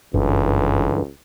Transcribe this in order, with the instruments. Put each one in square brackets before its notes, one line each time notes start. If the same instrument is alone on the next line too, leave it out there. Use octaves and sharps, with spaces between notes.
[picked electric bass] F#1 [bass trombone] C#2 [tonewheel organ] G2 D3 E3